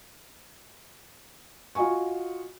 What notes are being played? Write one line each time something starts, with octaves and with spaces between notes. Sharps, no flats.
F4 F#4 D#5 G#5 C#6